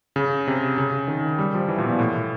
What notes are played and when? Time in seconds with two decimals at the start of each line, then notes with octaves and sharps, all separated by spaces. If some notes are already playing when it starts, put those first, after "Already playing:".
0.16 C#3
0.47 C3
0.78 C#3
1.08 D#3
1.38 G3
1.54 F3
1.68 E3
1.78 A#2
1.84 B2
1.99 A2